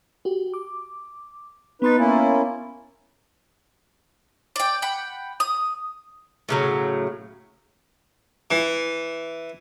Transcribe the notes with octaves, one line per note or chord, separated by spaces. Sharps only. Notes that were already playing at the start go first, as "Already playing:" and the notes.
F#4 G4
D6
B3 D#4 B4 C6 A6
A#3 C#4 E4
D5 G5
F#5 G5 B5
D#6
A2 C#3 F#3
E3